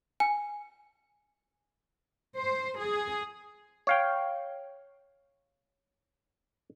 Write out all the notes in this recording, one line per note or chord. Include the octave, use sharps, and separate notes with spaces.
G#5
C5
G#4
C#5 F5 G5